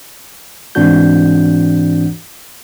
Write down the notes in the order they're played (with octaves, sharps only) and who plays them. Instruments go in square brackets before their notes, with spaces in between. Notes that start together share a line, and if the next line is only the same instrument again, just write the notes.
[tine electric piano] G#2 E3 C4 D4 F#4 G6